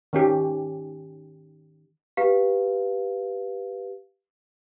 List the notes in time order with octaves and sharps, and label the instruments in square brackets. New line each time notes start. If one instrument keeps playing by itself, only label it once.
[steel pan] D#3 C#4 G4
[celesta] G4 B4 F5